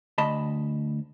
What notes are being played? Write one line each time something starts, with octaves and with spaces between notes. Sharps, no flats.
D2 D#5 A5 B5